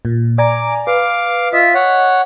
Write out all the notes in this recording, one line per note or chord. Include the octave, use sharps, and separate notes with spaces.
A#2
D5 G#5 A#5 D6
B4 F5 D6
F4 D#5 E5
C#5 F#5